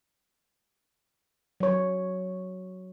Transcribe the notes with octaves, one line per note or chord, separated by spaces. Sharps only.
F#3 C#5